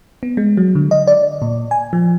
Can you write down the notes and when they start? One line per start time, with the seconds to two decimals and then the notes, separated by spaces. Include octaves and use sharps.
0.23 B3
0.37 G#3
0.57 F#3
0.75 D3
0.91 D#5
1.07 D5
1.42 A#2
1.71 G#5
1.93 F3